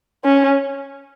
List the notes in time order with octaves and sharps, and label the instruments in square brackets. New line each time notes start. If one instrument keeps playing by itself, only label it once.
[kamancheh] C#4